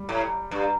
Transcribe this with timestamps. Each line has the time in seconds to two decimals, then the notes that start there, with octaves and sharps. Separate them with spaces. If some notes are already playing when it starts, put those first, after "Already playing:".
Already playing: G3
0.09 A2
0.51 G2